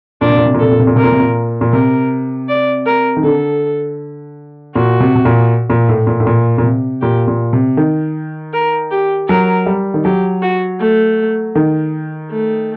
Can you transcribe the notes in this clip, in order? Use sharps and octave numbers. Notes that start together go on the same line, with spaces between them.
A#2 D4
C3
A#2
C3
A#2
C3 A4
A#2
C3
A#2
C3 A#4
A#2
C3
A#2
A#2
C3 A#4
D5
A#4
D#3
D3 A4
A#2 F#4
C3
C3
A#2
A#2
A2
A#2
A2
A#2
A#2
C3
A#2 G4
A#2
C3
D#3
A#4
G4
F#3 A#4
G3
D#3
F#3 G4
F#4
A3
D#3
A3